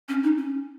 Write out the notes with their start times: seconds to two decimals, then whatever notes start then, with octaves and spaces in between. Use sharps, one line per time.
0.09 C#4
0.23 D#4
0.38 C#4